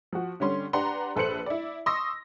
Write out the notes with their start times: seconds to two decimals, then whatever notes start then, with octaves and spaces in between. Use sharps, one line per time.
0.13 F3 F#4
0.40 D3 G3 C#4 C6
0.73 D4 G4 B4 F#5 A#5 C6
1.16 A#1 A4 B4 C5 C#7 F#7
1.46 E4 D5
1.86 C6 C#6 D#6 E6 A#6